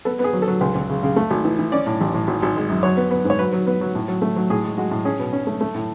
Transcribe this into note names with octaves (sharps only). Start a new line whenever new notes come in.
B3 A4
B3
G#4
F#3
A4
F#3
C#2
C#2
C#3
C#3
A3
G#1
E3
E3
C#4 D5
A2
A1
A2
G#1
G#1
G#3
F#2
F#3 C#5
B3
B3
G#2 C#5
F#3 B4
F#3
B3
F#3
A2
F#3
A3
F#3
A2 G#4
G#3
G#3 F#4
A2
C#4 G#4
B2
C#4
A3
A3
A2